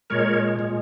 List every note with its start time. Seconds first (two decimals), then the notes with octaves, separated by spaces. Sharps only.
0.10 A#2 G#3 A#4 C#5
0.59 A#2 G#3